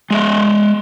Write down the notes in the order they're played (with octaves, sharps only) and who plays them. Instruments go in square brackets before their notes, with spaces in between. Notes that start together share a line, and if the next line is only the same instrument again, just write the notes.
[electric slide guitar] G#3 D#5 E5